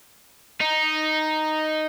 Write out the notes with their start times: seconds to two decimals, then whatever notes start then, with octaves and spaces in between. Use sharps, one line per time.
0.61 D#4